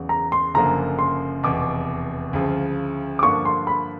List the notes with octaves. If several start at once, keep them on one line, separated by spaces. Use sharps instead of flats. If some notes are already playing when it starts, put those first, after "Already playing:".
Already playing: E2 C#3 F#3
A#5
C6
F#1 F#2 D3 F3 A#3 A#5
C6
F1 E2 B2 D6
D2 C#3 F3
D6
G2 D3 F3 A#3 D4 C#6
C6
B5